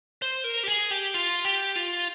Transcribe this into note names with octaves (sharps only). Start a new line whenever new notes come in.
C5
A#4
G4
G#4
G4
F4
G4
F4